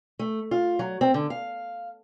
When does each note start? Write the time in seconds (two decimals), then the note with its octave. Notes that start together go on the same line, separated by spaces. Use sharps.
0.19 A3
0.51 F4
0.79 F#3
1.01 C4
1.14 D3
1.30 F5